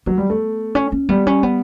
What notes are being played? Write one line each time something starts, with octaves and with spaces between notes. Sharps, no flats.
F#3 B3
G3
A3
C#4
C#4
G3 B3
C#4
B3